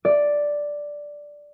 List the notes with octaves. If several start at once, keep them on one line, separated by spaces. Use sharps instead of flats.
D5